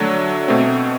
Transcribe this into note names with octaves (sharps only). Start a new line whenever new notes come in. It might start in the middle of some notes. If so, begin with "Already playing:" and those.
Already playing: D3 F#3 A3 D4 A4
B2 A3 C4